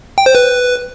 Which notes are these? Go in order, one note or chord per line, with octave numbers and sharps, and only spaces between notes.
G5
C5
B4